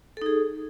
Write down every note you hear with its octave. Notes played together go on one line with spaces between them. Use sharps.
D#4 G#4 A4